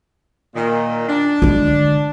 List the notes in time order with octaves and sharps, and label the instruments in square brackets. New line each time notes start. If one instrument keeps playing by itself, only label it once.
[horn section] A#2 D#3
D4
[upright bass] D3 G#3